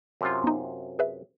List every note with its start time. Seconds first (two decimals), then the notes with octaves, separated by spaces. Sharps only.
0.21 F#2 C3 F4
0.44 B3 D#4
0.99 G#4 B4 E5